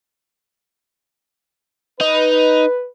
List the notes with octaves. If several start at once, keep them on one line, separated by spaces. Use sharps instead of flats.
D#4 B4